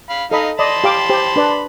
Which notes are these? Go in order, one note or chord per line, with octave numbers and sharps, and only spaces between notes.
F5 B5
D#4 A4 D#5 F5 B5
D5 D#5 A5 B5 C6
G4 F5 D6
G4 C5
D4 B4 D5